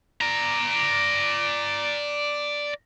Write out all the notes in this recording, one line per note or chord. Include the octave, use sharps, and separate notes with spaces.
D5 A#5